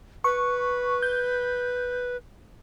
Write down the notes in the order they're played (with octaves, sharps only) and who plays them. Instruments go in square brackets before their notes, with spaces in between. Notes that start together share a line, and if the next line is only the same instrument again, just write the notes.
[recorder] B4 [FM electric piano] C#6
[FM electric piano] G6